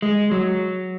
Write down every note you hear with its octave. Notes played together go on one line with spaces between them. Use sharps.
G#3
F#3